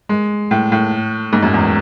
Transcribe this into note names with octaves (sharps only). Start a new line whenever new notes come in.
G#3
A2
A2
G#2
F#2
E2